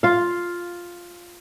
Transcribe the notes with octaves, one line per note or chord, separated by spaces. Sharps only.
F4 F5